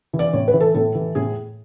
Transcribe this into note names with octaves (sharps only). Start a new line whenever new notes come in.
E3
D5
A2 C#5
B4
E3
A4
A2 A4
E3
A2 G#4